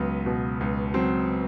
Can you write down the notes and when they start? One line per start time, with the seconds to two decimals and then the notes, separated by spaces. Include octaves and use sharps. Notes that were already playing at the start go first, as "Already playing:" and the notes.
Already playing: C#2 F#3 B3
0.26 B2
0.61 C#2
0.94 F#3 C4